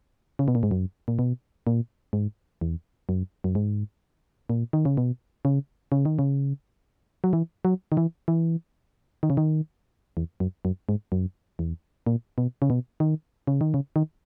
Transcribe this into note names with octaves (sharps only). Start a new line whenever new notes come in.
C#3
B2
A#2
G#2
F#2
A#2
B2
A#2
G#2
E2
F#2
F#2
G#2
A#2
D#3
C#3
B2
C#3
C#3
D#3
C#3
F#3
E3
F#3
D#3
E3
E3
D#3
C#3
D#3
E2
F#2
F#2
G#2
F#2
E2
A#2
B2
C#3
B2
D#3
C#3
D#3
C#3
D#3